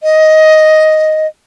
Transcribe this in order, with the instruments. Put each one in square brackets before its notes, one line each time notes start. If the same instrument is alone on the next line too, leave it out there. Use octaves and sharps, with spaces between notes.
[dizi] D#5